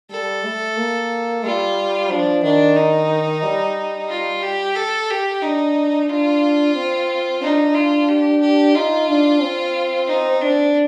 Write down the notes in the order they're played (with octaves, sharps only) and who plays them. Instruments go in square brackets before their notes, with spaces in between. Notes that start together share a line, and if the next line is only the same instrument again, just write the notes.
[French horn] G3 [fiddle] A4
[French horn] A3
A#3
[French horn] G3 [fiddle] F4
[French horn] F3 [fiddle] D4
[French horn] D#3 [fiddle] D4
[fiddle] D#4
[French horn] G3
[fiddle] F4
G4
A4
G4
[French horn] D4 [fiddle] D#4
[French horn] D4 [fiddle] F4
[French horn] C4
[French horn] D4 [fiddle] D#4
[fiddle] F4
G4
G4
[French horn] D#4 [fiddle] F4
[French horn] D4
C4
[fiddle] D#4
D4